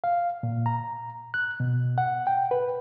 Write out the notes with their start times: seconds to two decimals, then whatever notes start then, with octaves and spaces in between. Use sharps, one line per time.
0.04 F5
0.43 A#2
0.66 A#5
1.34 F#6
1.60 B2
1.98 F#5
2.27 G5
2.51 B4